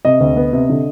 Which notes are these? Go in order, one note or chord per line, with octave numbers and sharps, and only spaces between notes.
C3 D#5
D2
B3
C3
D3